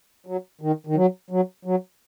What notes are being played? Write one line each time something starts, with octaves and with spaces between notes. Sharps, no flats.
F#3
D#3
D#3
F#3
F#3
F#3